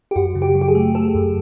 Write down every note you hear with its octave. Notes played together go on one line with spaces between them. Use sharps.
G4
F#2 F#4
C#3
G4
F#3
G4
G#4
A3
A3 A4
F#2